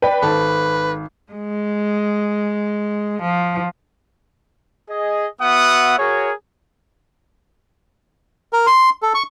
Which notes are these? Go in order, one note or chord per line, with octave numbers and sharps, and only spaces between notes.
B4 D5 G5
G#1 A4 B4 A5
G#3
F3
G#4 D#5
B3 F#4 E5 F#5 D#6
F#4 G#4 A#4 C#5
A#4
C6
A4
C#6